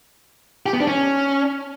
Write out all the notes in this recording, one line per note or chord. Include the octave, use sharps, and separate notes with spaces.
G4
B3
D4
C#4